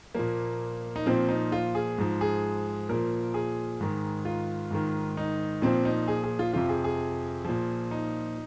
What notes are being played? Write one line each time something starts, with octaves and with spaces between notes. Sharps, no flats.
A#2 F3 A#3
D#4
A#2 F3 C4
D#4
F4
G#4
G#2 F3
G#4
A#2 F3 A#4
G#4
G#2 D#3
F4
G#2 D#3
D#4
A#2 F3 C4
D#4
G#4
G#4
F4
F2 C3 F3 F4
G#4
G#4
A#2 F3
D#4